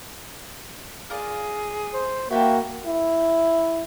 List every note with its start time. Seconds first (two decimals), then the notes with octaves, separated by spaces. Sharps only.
1.10 F4 G#4 A#4 D5
1.94 C5
2.31 A#3 F#4 D5 E5 G5 B5
2.86 E4